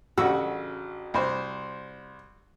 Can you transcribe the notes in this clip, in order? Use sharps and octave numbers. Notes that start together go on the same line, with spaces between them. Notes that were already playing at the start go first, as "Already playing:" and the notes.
A1 C#3 F#4 E6
C2 C5